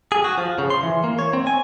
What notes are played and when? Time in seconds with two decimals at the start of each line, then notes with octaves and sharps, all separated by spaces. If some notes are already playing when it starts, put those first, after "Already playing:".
0.12 G#4
0.24 F#4
0.38 F3
0.59 C#3
0.70 C6
0.83 E3
1.04 A#3
1.19 C#5
1.33 C4
1.47 G#5